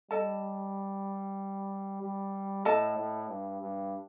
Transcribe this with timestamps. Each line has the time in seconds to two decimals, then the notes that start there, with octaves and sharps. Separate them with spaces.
0.11 G3 A4 D#5 A5
2.02 G3
2.65 A2 A4 D#5 A5
2.98 A2
3.29 G2
3.61 G2